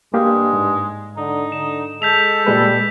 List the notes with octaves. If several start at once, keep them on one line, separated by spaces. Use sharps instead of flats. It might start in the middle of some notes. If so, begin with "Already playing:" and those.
G2 G#3 A#3 G4 F5
G#2
D3 D#4
D3 E7
G#3 A4 G6 B6 F7
A#2 G3 G#3 B4